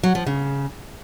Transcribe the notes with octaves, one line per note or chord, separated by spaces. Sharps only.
F#3
F3
C#3